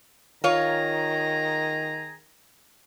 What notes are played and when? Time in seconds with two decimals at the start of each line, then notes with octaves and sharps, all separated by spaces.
0.44 D#3 F4 G#4 C#5 A#5